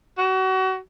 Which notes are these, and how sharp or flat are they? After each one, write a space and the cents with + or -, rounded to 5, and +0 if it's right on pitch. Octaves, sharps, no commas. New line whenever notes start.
F#4 +30